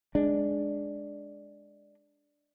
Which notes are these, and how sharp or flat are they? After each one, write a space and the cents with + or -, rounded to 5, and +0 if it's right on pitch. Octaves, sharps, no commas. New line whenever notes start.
G#3 +0 D4 +0